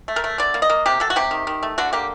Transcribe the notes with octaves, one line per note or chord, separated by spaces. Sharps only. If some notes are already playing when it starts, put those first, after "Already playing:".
A3
A#4
A3
D3 D5
A#3
D#5
A#3
C3 G4
F#3 A4
F#4
C3 G4
D#3
D#3
A3
D3 F#4
A#3 G4